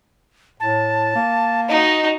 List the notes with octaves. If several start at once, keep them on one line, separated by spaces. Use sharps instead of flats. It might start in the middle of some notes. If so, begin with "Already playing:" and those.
A2 A5
A#3
D#4 F#4 D#5